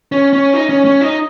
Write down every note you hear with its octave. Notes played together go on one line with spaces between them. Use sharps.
C#4
C#4
D#4
C#4
C#4
D#4